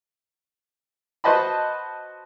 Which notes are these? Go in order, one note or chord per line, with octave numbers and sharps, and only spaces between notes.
F#4 B4 C5 D#5 A5 B5